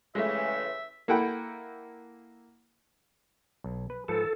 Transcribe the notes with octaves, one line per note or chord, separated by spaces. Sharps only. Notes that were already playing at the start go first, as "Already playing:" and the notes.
G2 C#3 E3 G#3 A3 E5
A#3 E4 A4 F#5 G5 B5
B1
B4
G#2 F3 A4 B4